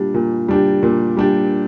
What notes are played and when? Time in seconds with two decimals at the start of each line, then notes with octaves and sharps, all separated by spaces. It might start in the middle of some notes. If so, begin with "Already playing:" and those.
Already playing: A#2 G3 D4 G4
0.14 A#2
0.48 G3 D4 G4
0.83 A#2
1.17 G3 D4 G4